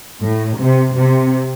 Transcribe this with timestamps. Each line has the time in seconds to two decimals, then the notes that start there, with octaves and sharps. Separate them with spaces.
0.24 A2
0.59 C3
0.97 C3